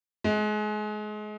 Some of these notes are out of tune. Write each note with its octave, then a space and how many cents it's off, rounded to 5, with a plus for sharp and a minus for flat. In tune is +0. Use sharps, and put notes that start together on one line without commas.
G#3 +30